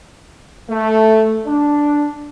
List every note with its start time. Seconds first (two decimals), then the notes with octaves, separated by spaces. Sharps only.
0.70 A3
1.46 D4